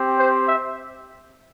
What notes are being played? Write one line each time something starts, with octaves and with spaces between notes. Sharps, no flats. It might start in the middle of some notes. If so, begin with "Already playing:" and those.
Already playing: C4 G4
C5
E5